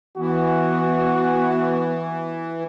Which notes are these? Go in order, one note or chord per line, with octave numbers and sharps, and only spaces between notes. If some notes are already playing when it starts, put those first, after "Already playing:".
E3 B3 F#4